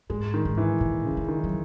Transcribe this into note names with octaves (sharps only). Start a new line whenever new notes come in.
G#2 G#3
D#3
G#2
E3
A#2
C#3
D#3
E3
D#3
F#3